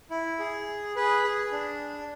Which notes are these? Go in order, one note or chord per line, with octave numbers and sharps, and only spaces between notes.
E4
G#4
G#4 B4
G#4
D4